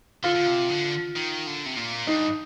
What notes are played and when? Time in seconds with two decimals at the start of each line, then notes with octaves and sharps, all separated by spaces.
0.24 D3 F4
0.36 D3
0.47 C3
0.69 D3
1.16 D#3
1.47 D3
1.66 C3
1.77 A#2
2.07 G2 D#4